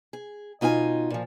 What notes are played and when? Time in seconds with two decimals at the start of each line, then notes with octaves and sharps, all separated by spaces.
0.13 G#4
0.61 B2 D#4 F4 A4 G#5
1.10 A#2 F3